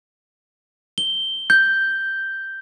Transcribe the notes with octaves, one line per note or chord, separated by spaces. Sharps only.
G7
G6